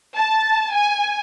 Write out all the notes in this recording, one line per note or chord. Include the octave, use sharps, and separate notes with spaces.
A5
G#5